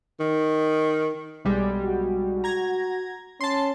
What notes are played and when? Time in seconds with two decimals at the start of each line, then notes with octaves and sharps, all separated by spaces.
0.20 D#3
1.45 B1 G3 G#3
1.86 F#4
2.44 A#5 G#6 A#6
3.41 C#4 A5 C6